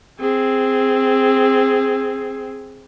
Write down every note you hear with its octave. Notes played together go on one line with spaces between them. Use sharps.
C4 G#4